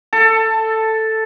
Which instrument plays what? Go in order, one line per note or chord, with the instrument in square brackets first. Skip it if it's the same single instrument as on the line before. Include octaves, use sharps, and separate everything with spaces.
[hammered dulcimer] A4